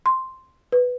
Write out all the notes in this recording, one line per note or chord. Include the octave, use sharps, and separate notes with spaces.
C6
B4